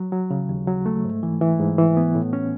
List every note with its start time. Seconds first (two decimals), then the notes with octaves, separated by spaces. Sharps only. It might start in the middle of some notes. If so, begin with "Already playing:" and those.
Already playing: F#3
0.12 F#3
0.30 C#3
0.49 D#2
0.68 F#3
0.86 A3
1.05 G#2
1.23 E3
1.41 E3
1.60 G#2
1.78 E3
1.97 B3
2.15 A2
2.33 C#4